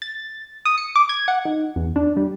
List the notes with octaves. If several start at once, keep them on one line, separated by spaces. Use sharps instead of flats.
A6
D#6
C#7
D6
G#6
F#5
D#4
E2
D4
G3